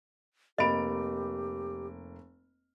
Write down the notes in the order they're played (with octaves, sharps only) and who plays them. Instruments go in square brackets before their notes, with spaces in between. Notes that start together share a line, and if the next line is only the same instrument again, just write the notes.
[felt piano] F1 A#3 D7 [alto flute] G4 [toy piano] D#5 B5